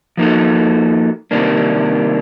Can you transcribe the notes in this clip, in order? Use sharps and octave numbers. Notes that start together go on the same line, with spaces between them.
F3 A#3 D#4 F#4 A4
C3 D#3 G3 A#3 D4